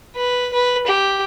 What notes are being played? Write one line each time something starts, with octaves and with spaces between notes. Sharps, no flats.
B4
B4
G4